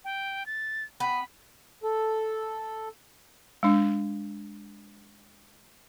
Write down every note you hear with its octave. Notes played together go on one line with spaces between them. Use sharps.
G5
A6
B3 B5
A4
G#3 D4